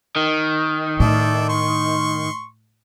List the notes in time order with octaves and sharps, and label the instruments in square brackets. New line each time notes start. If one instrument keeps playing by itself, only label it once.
[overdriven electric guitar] D#3
[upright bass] A2 [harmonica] A4 D5 E5
[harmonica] C6 C#6